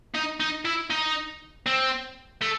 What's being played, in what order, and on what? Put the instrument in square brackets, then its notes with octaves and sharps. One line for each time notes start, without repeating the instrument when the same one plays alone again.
[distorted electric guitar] D#4
D#4
E4
D#4
C4
A3